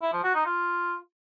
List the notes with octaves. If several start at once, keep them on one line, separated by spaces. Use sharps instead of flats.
E4
F3
F#4
D#4
F4